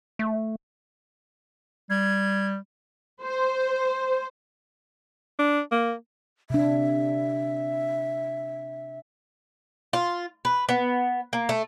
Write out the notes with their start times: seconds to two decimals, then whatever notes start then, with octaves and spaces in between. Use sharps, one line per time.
0.19 A3
1.90 G3 G#6
3.23 C5
5.39 D4
5.71 A#3
6.50 C3 D4 E5
9.93 F4
10.45 B4
10.69 B3
11.33 A#3
11.49 A3